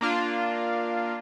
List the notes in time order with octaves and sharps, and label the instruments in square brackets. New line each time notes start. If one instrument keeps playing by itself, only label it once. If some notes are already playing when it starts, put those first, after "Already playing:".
[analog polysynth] A#3 D4 F4